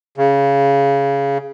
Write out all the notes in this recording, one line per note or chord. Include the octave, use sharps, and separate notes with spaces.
C#3